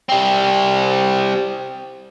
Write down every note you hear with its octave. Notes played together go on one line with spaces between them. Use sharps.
G3 C4